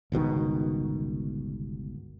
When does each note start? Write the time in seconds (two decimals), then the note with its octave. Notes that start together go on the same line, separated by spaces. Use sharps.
0.12 G1 C#2 B2 D#3